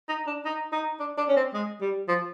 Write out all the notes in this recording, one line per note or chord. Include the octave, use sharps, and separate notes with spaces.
D#4
D4
D#4
D#4
D4
D4
C#4
C4
G#3
G3
F3